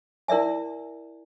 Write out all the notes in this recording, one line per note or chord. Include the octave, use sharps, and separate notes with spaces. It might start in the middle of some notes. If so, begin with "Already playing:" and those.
E4 A#4 D5 E5 G#5